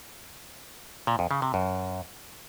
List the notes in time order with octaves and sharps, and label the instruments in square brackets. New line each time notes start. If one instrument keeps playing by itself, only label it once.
[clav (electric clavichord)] A#2
F2
C#3
C3
F#2